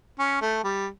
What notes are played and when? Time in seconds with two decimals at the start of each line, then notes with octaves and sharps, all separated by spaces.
0.19 C#4
0.41 A3
0.64 G3